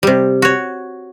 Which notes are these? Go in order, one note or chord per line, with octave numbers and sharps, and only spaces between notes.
C3 G3
F#4 C#5